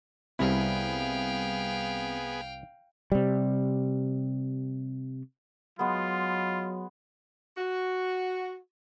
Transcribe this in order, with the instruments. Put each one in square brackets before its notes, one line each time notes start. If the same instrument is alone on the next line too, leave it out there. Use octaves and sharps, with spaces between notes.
[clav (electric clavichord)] C2 E4 [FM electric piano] G3 C4 [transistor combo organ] B3 G#4 [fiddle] F5 G5
[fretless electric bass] C3 G3
[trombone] F#3 [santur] G#3 B3 [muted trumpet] F4
[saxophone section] F#4